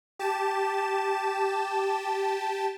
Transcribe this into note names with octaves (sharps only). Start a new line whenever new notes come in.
G4 A5 E7